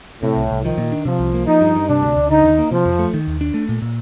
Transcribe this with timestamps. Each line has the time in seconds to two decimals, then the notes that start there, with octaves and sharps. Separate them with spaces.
0.23 A2 C3
0.36 C2
0.51 C2
0.64 D#3 F3
0.78 A#2
0.92 D4
1.05 C3 F3
1.19 C2
1.34 A#3
1.47 F3 D#4
1.61 G2
1.75 G2
1.89 C3 D4
2.02 D2
2.16 D2
2.30 D3 D#4
2.44 D#2
2.58 A#3
2.71 C3 F3
2.85 F2
2.99 A3
3.14 D#3
3.27 D#2
3.41 D4
3.54 A3
3.69 A#2
3.82 A#2